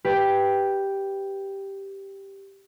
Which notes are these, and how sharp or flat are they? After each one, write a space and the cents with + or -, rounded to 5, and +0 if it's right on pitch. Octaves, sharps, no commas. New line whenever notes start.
G4 +0 B4 +0